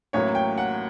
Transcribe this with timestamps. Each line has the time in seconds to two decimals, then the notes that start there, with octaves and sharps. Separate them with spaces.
0.13 A1 A2 F#3 A#3 C#5
0.35 G5
0.58 F#5